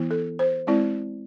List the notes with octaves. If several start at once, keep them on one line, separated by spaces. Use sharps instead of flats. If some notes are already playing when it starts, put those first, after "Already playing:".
Already playing: E3 B3 E4
A4
C5
G#3 C4 E4 D5